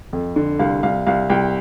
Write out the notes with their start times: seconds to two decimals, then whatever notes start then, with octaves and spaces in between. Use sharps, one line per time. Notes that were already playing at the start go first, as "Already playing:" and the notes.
0.13 F2
0.36 D3
0.59 C2 F5
0.83 C2 F5
1.07 C2 F5
1.30 C2 G5